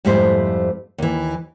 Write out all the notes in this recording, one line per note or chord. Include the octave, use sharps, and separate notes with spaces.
F2 G#2 G3 A3 E4 C5
D#2 E3